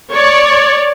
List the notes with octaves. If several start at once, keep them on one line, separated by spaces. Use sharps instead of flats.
C#5 D5